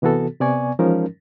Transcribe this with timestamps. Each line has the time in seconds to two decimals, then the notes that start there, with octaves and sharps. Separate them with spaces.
0.02 C3 E3 B3 F#4 A4
0.40 C3 B3 D5 G#5 C#6
0.79 E3 F3 G#3 C#4 D#4 A#4